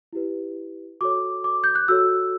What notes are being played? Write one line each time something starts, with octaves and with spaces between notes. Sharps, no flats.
E4 G4 B4
F#4 A4 C#5 D6
D6
G6
F#6
F#4 A4 C#5 E6